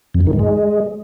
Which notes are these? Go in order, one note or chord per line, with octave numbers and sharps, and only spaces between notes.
F2
F#2
D#3
G#2
G#3